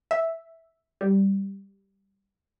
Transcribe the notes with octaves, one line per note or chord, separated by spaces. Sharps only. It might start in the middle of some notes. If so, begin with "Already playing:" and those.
E5
G3